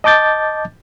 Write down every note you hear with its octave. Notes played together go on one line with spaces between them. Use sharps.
D#5 A5 D6 G6 A6